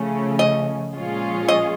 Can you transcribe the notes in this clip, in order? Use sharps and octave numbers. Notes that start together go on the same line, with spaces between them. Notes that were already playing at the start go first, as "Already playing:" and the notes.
Already playing: C#3 F3 A3 C#4
D#5
A#2 F3 G#3 C#4 F4
D#5